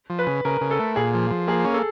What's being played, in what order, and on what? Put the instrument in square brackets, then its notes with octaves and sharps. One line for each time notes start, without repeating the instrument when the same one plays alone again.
[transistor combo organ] F3
[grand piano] B4
[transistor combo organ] C#3
[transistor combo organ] C#3 [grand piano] A#4
[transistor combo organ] C#3
[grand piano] A4
[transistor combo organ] A3
[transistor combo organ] A#2 [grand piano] G#4
[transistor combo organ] F3
F3
[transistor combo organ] A#3 [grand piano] G#4
[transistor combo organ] C#4
[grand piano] A4